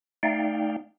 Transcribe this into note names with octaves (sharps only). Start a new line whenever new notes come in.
A3 D#4 D5 F5 G5